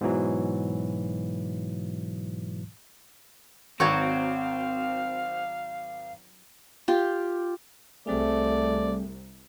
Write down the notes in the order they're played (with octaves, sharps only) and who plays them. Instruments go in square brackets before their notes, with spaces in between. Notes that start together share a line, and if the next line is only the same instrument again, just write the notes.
[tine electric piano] G#2 B2 E3 F#3
[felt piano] G#1 G#6 [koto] F#3 F#4 [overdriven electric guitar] C4 [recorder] F5
[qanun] F4 G4
[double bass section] C2 [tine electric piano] G3 C4 G#4 [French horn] A3 [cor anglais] D5